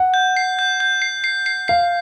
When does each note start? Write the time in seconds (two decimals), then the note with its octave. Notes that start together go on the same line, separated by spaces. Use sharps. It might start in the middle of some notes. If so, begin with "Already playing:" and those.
Already playing: F#5
0.14 G6
0.37 C7
0.59 G6
0.80 G6
1.02 C7
1.24 C7
1.46 C7
1.68 F5 C7